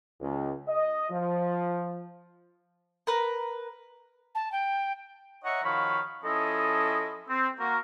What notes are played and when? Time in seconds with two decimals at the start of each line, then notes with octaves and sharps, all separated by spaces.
0.20 C#2
0.68 D#5
1.10 F3
3.07 A#4 B4
4.34 A5
4.52 G5
5.45 C#5 D#5 E5 F#5 A#5 C#6
5.64 D#3 F3 F#4 C#5 F5 B5
6.23 F3 C#4 E4 A4 D#5
7.29 C4
7.59 A#3 F#4 A#4